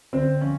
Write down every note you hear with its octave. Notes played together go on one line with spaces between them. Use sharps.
D3 C4
F3 C#4